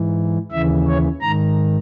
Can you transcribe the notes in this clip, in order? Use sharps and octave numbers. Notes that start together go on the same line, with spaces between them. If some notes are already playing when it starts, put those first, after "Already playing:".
Already playing: G#2 E3
D#2 C#3 E3 E5
C#5
G#2 D#3 A#5